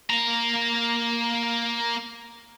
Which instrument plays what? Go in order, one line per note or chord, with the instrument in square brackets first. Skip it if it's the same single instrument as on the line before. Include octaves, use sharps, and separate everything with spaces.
[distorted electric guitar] A#3 A#5